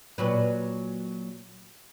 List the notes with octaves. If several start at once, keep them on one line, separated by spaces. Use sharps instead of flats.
A#2 F#3 B4